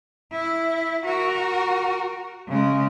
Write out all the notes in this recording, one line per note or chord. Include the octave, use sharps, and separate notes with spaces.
E4
F#4 A#4
C#3 G#3